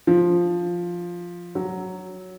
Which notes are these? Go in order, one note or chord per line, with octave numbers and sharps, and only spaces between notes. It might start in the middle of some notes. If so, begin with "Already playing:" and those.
F3
F#3